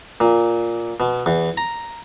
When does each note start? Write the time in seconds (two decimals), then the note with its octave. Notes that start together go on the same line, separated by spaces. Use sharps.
0.20 A#2
1.00 B2
1.26 E2
1.57 A#5